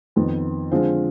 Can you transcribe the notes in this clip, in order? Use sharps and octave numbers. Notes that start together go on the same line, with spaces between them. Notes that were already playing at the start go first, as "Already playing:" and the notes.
F2 D#3 B3
D3 F3 G#3 C4 F4